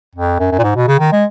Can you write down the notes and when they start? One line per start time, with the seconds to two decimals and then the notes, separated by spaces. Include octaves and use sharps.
0.15 F2
0.39 F#2
0.51 F#2
0.59 A#2
0.63 G#2
0.76 B2
0.88 C#3
1.00 D#3
1.12 G#3